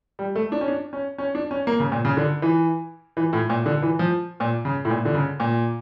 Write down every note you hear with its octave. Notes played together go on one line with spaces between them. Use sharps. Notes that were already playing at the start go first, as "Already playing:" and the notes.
G3
A3
D4
C#4
D4
C#4
C#4
D4
C#4
A#3
C#3
A#2
C#3
D3
E3
E3
A2
A#2
D3
E3
F3
A#2
C#3
A2
A#2
D3
C#3
A#2